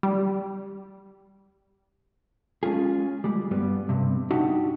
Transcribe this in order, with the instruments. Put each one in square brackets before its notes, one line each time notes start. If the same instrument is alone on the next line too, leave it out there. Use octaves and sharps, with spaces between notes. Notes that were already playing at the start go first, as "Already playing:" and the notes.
[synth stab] G3
[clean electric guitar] G#3 C#4 F4 G#4
G3 G#3
G2 G3 B3
G2 C3
D4 D#4 F#4 G4 E5 F#5